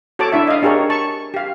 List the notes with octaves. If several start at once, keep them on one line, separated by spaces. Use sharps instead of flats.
F#4 A4 C#5 A5 D6
D4 E4 E5
D#5 F5
D4 G4 G#4 A#4 C#5
A5 C#6
G4 F5